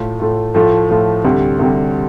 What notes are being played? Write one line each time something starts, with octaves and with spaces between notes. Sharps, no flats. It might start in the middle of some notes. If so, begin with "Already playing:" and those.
Already playing: A2 A3 F4
A2 A3 F4
A2 F3 A3 F4
A2 F3 A3 F4
D2 C3 G3
D2 C3 G3